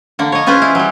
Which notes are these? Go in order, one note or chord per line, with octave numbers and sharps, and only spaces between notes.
D3 A#3
C#5 D#5
C#4 F4 G#4 B4 C5
E4
F#3 G3